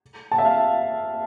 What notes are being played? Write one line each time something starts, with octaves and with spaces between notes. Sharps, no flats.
A5
E5
F5